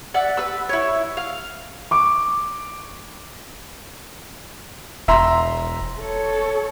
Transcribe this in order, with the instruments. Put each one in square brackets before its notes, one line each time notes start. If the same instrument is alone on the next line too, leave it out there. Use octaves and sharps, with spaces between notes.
[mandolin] D5 E5 F#5
B4 E6
E4 C#5
F5
[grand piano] C#6 D6
[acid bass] E1 [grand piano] E5 A#5 C6
[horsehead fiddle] A4 C#5